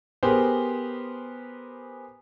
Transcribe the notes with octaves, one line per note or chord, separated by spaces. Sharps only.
B3 G4 G#4 A#4 C5